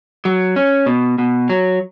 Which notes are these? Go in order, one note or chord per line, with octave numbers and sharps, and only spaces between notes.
F#3
C#4
B2
B2
F#3